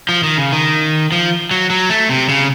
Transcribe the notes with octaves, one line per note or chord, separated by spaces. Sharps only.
F3
D#3
C#3
D#3
F3
F#3
F#3
A3
C3
C#3